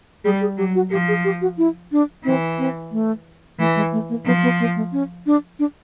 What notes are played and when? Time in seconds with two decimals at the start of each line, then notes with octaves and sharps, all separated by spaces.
0.25 G3 G#4
0.41 G#4
0.58 F#3 G4
0.75 F#4
0.91 F3 G4
1.08 G#4
1.25 G4
1.42 F#4
1.58 E4
1.92 D4
2.25 E3 C4
2.58 C4
2.92 A3
3.59 E3 A3
3.76 G#3
3.92 A3
4.09 A#3
4.26 F3 B3
4.43 B3
4.60 A#3
4.76 A3
4.92 C#4
5.26 D4
5.59 D4